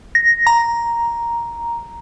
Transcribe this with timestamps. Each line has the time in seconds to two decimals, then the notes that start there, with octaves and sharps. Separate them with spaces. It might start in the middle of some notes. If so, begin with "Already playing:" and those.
0.15 A#6
0.47 A#5